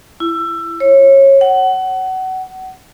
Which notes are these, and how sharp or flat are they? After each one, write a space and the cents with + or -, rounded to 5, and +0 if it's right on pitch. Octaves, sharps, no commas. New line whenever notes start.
E4 +20
C#5 -25
F#5 +25